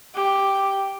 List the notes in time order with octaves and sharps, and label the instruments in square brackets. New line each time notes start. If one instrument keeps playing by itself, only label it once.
[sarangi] G4